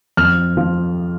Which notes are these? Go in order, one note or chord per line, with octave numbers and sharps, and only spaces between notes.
F2 F6
F3